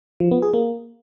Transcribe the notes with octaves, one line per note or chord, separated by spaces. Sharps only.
F3
B3
G#4
A#3